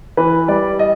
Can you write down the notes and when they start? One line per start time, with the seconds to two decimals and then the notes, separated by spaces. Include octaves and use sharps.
0.17 E3 B4
0.48 G3 D5
0.79 D#5